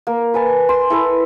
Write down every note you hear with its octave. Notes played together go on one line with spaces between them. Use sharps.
A#3
B4 G#5 A5
C6
E4 A4 B4